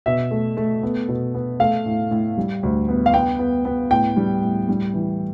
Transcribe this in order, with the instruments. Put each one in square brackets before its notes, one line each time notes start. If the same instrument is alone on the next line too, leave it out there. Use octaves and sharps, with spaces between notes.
[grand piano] B2 E5
A3
A3
B3
B2
B3
A3 F5
A2
A2
G3
D2
B3
F5
B3 G5
B3
B3
A2 G5
G3
A2
G3
E3